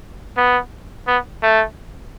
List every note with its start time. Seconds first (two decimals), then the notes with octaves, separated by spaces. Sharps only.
0.37 B3
1.07 B3
1.42 A3